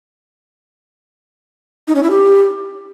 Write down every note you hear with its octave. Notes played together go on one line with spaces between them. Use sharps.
D#4
C#4
E4
G4